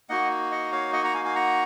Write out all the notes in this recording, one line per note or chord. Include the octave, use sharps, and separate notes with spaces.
A#3 D#4 F#4 D#5 F#5
D#5 F#5
C#5 F5
D#5 F#5
F#5 A#5
F5 G#5
F5 G#5
F#5 A#5